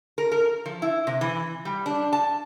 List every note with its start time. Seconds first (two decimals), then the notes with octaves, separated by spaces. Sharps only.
0.18 A#4
0.31 A#4
0.66 F3
0.82 E4
1.07 C3
1.21 E3
1.65 G3
1.86 D4
2.13 A5